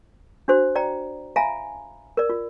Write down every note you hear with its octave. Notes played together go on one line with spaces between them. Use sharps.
D4 F#4 C5
D5 G5 A#5
E5 F5 G#5 A#5 B5
A#4 D5
F4